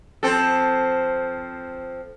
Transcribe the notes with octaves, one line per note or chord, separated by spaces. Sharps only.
F3 C4 A4